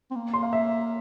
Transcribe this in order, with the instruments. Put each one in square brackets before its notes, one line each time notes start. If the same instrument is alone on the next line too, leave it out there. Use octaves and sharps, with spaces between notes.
[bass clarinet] C4
A#3
[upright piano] C6
F5
E5